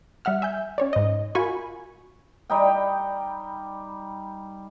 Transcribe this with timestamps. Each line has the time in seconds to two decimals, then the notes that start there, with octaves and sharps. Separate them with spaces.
0.25 G3 E5 F#5 F6
0.42 E5 G#5 G6
0.78 C#4 C#5 D5
0.93 G#2 D#5
1.35 F4 F#4 A#4 G#5 B5 C#6
2.50 G3 D#4 G5